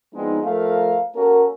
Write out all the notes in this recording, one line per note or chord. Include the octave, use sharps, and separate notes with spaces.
F3 G#3 B3 C4 D4 D#4
F3 A3 A4 A#4 F5
A#3 C#4 F#4 A4 A#4